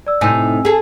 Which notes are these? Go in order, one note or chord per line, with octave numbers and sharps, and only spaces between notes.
D5 E6
A2 C3 D#4 G#5 E6
G#4 A4